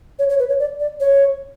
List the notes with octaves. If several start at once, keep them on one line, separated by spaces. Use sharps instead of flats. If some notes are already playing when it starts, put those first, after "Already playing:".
C#5
C#5
B4
C#5
D5
D5
C#5